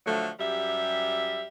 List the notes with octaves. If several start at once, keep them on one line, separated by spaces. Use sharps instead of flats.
D3 F3 F#3 A3
F#2 G3 G4 E5